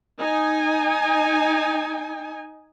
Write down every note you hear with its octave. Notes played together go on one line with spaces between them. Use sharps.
D#4 G#5